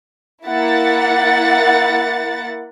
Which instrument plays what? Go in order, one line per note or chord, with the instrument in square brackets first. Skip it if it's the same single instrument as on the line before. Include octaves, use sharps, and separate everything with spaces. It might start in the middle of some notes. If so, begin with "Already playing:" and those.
[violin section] A#3 E4 F#5 A6